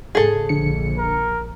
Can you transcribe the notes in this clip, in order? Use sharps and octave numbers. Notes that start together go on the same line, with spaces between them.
G#2 C#3 G#4 A4
A#1 D3 C#7
A#4